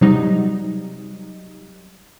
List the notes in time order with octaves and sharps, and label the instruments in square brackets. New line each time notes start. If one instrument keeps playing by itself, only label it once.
[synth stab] C3 F#3 G3 D#4